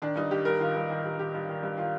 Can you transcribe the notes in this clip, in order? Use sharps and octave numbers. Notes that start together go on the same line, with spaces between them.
D#3 D4
G2 D#4
D#3 G4
G2 A#4
D#3 F4
G2
D#3
G2
D#3 G4
G2
D#3
G2
D#3 F4